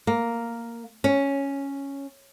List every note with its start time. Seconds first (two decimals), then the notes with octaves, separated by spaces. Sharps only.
0.07 A#3
1.04 C#4